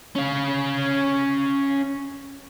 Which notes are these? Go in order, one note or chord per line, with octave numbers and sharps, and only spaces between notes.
C#4 F5